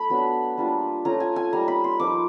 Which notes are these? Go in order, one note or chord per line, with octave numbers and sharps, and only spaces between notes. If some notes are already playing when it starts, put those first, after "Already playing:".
Already playing: A3 B5
F#3 B3 D4
G3 A#3 D4 F4
A3 C#4 F4 A#5
G#5
G#5
G3 A#3 D#4 A#5
B5
C6
F3 A#3 D#4 D6